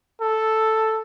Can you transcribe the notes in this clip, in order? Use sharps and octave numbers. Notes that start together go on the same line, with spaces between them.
A4